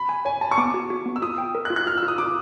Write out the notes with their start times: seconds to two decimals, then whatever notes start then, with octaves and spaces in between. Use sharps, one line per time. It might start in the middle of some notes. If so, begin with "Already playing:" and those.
Already playing: B5
0.09 G#5
0.25 C#5 G#5
0.41 G#5 A5
0.51 C#6
0.58 B3 D6
0.74 F#4
0.90 F#4
1.06 B3
1.16 E6
1.22 F4 D#6
1.38 G5
1.55 A#4
1.65 F#6
1.70 F4
1.76 F#6
1.86 F4 F6
1.97 E6
2.03 F4
2.08 D#6
2.18 F4 D6